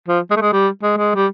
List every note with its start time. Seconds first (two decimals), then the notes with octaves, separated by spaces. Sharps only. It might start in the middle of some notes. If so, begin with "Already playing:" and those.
0.08 F3
0.31 G#3
0.36 A3
0.41 G#3
0.53 G3
0.83 G#3
0.97 G#3
1.15 G3